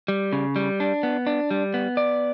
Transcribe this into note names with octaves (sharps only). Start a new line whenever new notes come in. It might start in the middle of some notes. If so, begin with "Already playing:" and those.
G3
C#3
G3
D4
B3
D4
G3
B3
D5